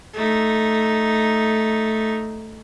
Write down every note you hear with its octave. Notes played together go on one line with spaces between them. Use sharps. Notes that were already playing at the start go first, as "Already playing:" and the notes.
A3 D#4